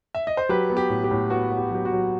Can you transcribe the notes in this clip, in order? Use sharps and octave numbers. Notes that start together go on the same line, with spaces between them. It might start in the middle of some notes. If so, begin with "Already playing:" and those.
E5
D#5
C5
F#3 G4 B4
B3
G4
A2
G4
A2
B3 F#4
B3
G4
F#3 G4
F#4
F#3